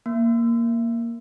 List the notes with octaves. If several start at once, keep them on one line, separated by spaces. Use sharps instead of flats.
A#3